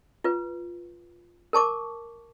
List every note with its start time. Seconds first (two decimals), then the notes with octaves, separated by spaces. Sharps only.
0.24 F4 B4
1.53 A#4 A5 C#6 D6